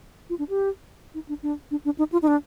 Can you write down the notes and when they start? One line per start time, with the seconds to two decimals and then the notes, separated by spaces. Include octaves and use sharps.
0.30 F4
0.39 D4
0.49 G4
1.14 D#4
1.29 D4
1.43 D4
1.71 D4
1.85 D4
1.98 D#4
2.12 F4
2.22 D#4
2.28 D4